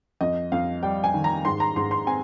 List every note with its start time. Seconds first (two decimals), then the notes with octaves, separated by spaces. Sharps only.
0.21 F2 D#5
0.52 F2 F5
0.83 G3 G5
1.04 G#5
1.14 D#3
1.24 A#5
1.45 G#2 C6
1.60 A#5
1.76 G#2 C6
1.91 C6
2.07 C4 G#5